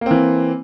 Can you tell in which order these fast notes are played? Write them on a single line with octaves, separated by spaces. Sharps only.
A#3 C4 E3